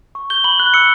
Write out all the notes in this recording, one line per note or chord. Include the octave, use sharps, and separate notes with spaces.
C#6
G6 G7
B5 F#7
F#6
E6 C#7